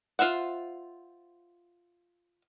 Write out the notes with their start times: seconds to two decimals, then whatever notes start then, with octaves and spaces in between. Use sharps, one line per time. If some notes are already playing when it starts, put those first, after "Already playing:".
0.19 F4 C5 E5 F#5